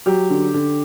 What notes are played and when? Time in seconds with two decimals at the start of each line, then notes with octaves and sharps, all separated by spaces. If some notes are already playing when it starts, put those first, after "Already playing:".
0.06 F#3 G4
0.30 D3
0.54 D3